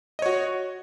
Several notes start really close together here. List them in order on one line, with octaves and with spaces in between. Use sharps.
D#5 C#5 F#4